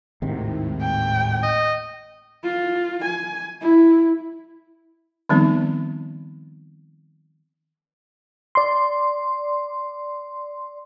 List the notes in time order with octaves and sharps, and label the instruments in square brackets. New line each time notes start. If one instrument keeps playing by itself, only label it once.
[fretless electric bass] G#1 C3 D#3 [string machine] D#2 A2
[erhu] G5
[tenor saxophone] D#5
[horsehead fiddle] F4
G#5
E4
[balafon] D#3 F3 G3 B3 C4 D#4
[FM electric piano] D5 C6